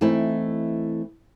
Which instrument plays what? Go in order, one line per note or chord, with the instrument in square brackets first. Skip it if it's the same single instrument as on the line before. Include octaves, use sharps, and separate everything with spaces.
[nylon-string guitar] E3 A3 C4 D#4 E4